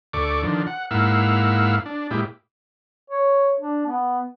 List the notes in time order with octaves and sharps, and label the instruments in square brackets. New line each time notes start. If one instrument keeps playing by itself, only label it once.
[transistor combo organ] D2 A3 D5 C#6 D6
D3 D#3 F3 D4
F#5
G#2 A#3 E4 F5 F#5 E6
D4
A#2 G#3 E4 G4
[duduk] C#5
D4
B3